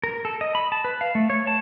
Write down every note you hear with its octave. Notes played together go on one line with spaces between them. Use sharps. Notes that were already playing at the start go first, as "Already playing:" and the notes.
A#4
A4
D#5
B5
A5
B4
F5
A3
C#5
A5